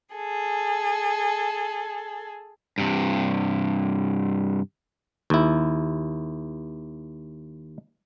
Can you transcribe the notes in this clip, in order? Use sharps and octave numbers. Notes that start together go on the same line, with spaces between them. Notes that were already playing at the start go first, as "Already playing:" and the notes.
G#4 A4
G2 C3
D#2 E4